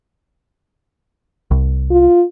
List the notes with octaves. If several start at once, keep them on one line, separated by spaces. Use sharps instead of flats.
C2
F4